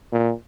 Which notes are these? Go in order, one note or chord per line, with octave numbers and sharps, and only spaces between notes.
A#2